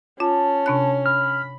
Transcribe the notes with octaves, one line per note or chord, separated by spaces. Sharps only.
C#4 F4 A5
C3 D4 F#6
B5 F6